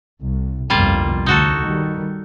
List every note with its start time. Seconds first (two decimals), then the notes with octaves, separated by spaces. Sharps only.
0.21 C2
0.70 G1 C2 F2 G3 A#3 F4
1.26 D2 C#3 D#4 F#4 A4
1.62 D#3 G3